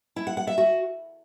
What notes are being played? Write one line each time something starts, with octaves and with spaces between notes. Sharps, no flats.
E4
F#5
F#5
E5
F#4